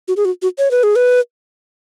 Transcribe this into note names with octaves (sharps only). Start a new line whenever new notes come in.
F#4
G#4
F#4
F#4
C#5
B4
G#4
B4